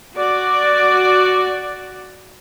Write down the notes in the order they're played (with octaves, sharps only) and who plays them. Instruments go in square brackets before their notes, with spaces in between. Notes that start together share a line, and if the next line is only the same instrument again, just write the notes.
[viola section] F#4 D5